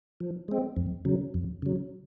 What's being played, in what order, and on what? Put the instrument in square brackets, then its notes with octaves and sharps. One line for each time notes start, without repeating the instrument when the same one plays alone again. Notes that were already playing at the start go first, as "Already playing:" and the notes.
[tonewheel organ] F3
G#3 C4
F2
C#3 F#3
F2
C#3 F#3